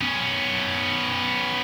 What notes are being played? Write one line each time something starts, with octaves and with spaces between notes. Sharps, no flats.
B3 C#4